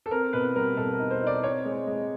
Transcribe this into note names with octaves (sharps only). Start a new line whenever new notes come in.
A4
C4 A#4
B2 B4
G3 A#4
B2 A4
A#4
D#4
C5
D#4
D5
C4 C#5
G#3
G#3